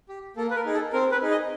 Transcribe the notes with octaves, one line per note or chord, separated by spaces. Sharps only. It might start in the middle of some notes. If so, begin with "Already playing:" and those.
G4
A#3 A4
B4
A#4
D#4 G#4
A4
C4 A#4
B4
D#4 G#4
D#5